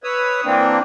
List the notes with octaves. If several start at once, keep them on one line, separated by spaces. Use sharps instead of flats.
B4 C#5 D#6 E6
E3 A#3 C4 D4